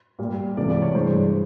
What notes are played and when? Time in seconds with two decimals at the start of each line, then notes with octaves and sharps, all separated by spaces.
0.19 A#2 G3
0.57 C#2 C3 E3 A3 D5
0.70 D5
0.82 C#5
0.95 G2 E3 G#3 C5